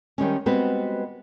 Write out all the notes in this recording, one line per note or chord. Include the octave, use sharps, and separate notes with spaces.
D#3 G3 G#3 C#4
G3 G#3 B3 C4 F#4 B4